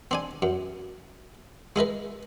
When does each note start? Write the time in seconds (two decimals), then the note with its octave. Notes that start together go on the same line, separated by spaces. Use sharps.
0.11 C4 D4 G#5
0.42 F#2
1.76 G#3 E4 A#4 B4